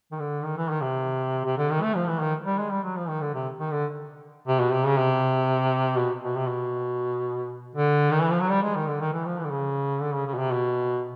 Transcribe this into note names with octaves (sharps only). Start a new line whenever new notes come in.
D#3
D3
D#3
E3
D#3
C3
C3
D3
D#3
A3
F3
E3
D#3
G3
G#3
G3
F#3
F3
D#3
D3
C3
D#3
D3
C3
B2
C3
C#3
C3
B2
B2
C3
B2
D3
D#3
E3
F3
F#3
G3
G#3
D#3
D3
D#3
E3
F3
E3
D3
C#3
D3
C#3
C#3
B2
C3
B2